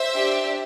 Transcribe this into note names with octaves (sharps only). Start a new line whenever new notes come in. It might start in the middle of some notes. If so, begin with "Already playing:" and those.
Already playing: C5 E5
D4 G4